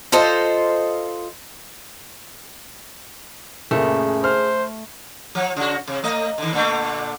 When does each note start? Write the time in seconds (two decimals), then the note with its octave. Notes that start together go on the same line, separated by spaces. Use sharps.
0.12 F4 A4 C5 D#5
3.71 F#1 A#2 C#3 A3 G#4
4.24 C5 F6
5.35 F3
5.57 C#3 F#4
5.87 C3
6.04 A3 D#5
6.38 D3 D#3
6.53 A#2 D3 A3